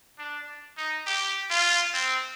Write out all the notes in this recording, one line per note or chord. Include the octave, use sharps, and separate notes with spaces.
D4
D#4
G4
F4
C4